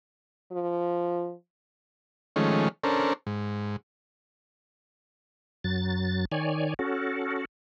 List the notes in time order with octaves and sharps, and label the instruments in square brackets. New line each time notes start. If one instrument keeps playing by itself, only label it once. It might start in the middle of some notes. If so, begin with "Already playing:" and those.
[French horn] F3
[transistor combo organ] D#3 F3 G#3 A3 C#4
C#4 D4 A4 A#4 C5
G#2
[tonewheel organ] F#2 F#3 A6
D#3 C#5 D5 G#5
C#4 F#4 A4